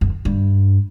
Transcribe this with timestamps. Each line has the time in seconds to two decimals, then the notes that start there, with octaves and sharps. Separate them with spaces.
0.01 F#2
0.25 G2